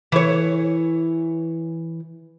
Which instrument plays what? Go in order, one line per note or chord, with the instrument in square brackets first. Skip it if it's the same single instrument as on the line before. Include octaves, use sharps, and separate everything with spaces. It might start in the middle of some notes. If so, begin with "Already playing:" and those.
[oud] E3 C#5